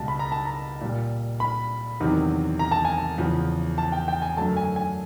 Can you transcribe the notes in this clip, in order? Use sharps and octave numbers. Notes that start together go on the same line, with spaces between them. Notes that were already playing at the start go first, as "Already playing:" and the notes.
Already playing: C#2 B2 G3 A5
B5
A#5
A5
A#5
A#2 G3
B5
E2 C3 D#3 F#3
A#5
A5
G#5
A5
E2 C#3 F3
A5
G5
G5
G#5
F#2 D3 F#3 A3 A5
G#5
G#5